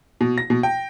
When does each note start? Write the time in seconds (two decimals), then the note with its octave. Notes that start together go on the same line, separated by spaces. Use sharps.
0.21 B2
0.38 A#6
0.50 B2
0.63 G5